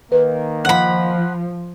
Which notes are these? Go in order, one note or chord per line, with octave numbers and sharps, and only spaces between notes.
D#3 A#3 B4
F3 F#5 B5